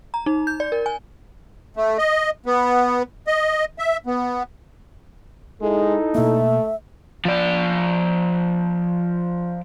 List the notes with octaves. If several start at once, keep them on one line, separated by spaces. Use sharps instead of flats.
A#5
D#4
G6
D5
A#4
G#5
A3
D#5
B3
D#5
E5
B3
G#3 D#4 E4 A4
B2 A3 A#3 E5
F3 D5